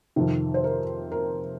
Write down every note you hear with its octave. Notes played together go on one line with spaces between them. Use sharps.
F2 C3 D#3
C5
A#4
A#4